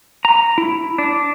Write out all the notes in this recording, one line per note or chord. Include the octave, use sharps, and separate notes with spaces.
A#5
E4
D4